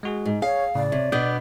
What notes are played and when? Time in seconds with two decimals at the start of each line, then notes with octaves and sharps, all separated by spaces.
0.03 G#3 F#4 G#4
0.25 G#2
0.42 G#4 C#5 F5
0.75 A2 C#3 D5
0.92 C3 C#5
1.12 B2 B3 D4 D6 D#6 G6